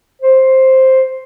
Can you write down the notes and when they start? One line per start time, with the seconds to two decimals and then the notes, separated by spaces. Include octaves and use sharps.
0.22 C5